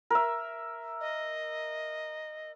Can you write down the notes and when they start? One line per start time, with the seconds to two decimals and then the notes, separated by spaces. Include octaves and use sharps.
0.10 A#4 E5
1.01 D#5